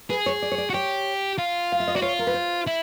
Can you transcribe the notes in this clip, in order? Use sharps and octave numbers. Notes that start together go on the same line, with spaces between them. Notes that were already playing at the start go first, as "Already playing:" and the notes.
G#4 B4
C#5
D5
C#5
D5
F#4
G4 C#5
F4
F5
E5
D#5
F#4 D5
F4 C#5
A#4
B4
C5
E4